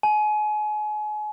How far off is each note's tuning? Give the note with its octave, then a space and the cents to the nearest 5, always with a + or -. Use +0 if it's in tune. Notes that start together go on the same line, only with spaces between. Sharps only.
G#5 +35